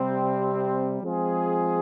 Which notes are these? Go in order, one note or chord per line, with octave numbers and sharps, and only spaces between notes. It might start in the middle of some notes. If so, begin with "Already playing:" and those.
Already playing: C3 G3 C4
F3 G#3 C4 F4 G#4